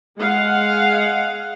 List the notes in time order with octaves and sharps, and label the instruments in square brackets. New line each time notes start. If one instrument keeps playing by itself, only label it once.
[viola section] G#3 F5 F#5